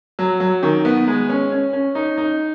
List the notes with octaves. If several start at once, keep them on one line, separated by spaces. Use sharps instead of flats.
F#3
F#3
D#3
B3
G#3
C#4
C#4
C#4
D#4
D#4